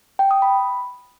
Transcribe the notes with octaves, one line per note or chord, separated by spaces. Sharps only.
G5
D#6
B5